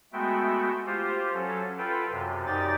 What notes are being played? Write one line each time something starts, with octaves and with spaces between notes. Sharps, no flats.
G#3 A3 B3 F#4 E5 G5
F4 G4 C5
F#3 C#4 A4
F4 A4 B4 G5
F#2 C3
F#2 D#4 G4 D5 G5 A6